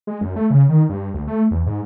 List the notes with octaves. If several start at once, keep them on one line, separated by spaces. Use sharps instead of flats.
G#3
F#2
A3
C#3
D#3
G2
D2
A3
E2
G#2